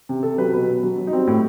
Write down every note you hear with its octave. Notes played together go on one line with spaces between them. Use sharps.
C3
C3 A4
F#3 B4
B2 B4
B2
F#3
F#3
D#4
G3 C4
A2